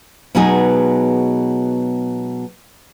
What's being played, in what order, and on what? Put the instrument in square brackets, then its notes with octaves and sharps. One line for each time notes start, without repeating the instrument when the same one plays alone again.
[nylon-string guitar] B2 F#3 G#3 B3 D#4 G#4